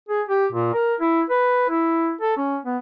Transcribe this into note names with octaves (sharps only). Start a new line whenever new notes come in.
G#4
G4
A#2
A#4
E4
B4
E4
A4
C#4
B3